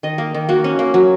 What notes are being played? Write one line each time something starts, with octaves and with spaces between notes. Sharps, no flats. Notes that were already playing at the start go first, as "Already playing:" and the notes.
D#3 D#5
A#3
D#3
A#3 F#4
C#4
A#3
F#3